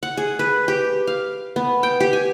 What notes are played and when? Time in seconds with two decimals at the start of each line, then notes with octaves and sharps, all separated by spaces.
0.03 F#5
0.17 G#4
0.39 B4
0.68 G4
1.07 F5
1.56 B3
1.83 G5
2.00 G4
2.13 G#5